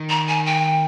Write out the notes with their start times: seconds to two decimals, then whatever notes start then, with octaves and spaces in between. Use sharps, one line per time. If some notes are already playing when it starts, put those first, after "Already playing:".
Already playing: D#3
0.09 A#5
0.28 G#5
0.46 G5